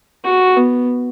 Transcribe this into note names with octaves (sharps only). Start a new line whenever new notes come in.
F#4
B3